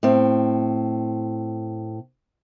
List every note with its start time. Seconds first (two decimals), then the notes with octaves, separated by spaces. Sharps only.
0.03 A2 C4